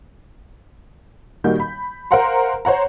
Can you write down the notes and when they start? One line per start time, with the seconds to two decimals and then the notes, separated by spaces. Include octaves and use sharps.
1.44 A#2 D#3 G3 F#4 G6
1.60 B5
2.11 A#4 C5 F5 F#5 A#5 C6
2.65 C5 C#5 F#5 A#5